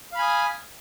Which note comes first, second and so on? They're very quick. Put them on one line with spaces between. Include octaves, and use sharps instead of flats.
F5 B5 G#5 D#6